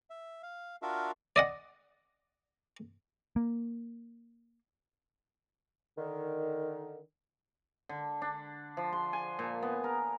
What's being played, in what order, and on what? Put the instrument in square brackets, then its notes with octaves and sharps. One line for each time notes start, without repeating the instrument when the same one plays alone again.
[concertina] E5
F5
D4 F4 F#4 A#4 E5 F5
[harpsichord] D5 D#5 F#5
[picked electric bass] A#3
[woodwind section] D3 D#3
[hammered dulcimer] D3
D4
F3
C6
G#5
A#2
B3
A#4